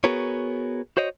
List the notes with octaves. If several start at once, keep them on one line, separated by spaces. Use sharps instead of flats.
B3 F#4 G#4 A#4 B4 C#5
F#4 C5 C#5 D#5